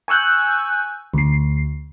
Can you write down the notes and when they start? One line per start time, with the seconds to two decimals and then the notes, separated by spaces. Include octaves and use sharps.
0.08 G#5 C#6 E6 F#6 G6
1.14 D2 C7